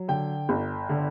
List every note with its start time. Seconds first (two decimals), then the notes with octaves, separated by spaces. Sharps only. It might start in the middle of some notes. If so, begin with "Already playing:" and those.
Already playing: F#3
0.08 D3 G5
0.49 G1
0.89 D3